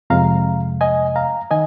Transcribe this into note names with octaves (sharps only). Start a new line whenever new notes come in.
F2 C3 G#3 F5 A#5
D#5 G#5
F5 A#5
D#3 D#5 G#5